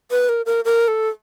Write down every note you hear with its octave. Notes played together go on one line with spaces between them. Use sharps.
B4
A#4
A#4
A#4
A4